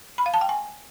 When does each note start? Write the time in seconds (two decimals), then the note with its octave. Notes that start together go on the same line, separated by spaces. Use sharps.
0.18 B5
0.26 F5
0.34 A5
0.41 G5
0.49 G#5